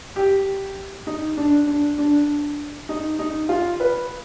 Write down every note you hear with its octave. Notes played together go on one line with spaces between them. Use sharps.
G4
D#4
D4
D4
D4
D#4
D#4
F4
B4